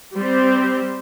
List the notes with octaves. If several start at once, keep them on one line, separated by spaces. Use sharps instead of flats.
G3 C4 G4 C5